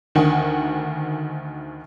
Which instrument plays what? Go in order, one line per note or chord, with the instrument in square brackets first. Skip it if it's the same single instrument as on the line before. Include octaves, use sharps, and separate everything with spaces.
[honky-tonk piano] D2 D#3 F#5 G#5